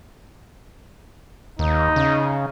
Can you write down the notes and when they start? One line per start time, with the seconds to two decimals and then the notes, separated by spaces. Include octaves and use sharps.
1.59 D#2 D#4
1.96 C#3